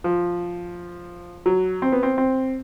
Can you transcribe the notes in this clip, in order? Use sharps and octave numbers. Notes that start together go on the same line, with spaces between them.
F3
F#3
C4
B3
C4
C4